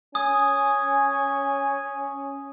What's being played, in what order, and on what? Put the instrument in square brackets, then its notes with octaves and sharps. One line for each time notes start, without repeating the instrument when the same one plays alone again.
[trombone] C#4 [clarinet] G#5 [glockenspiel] D#6